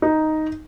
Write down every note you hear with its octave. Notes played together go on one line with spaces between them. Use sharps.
D#4